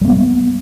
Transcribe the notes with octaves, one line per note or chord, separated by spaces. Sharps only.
G3 A#3 B3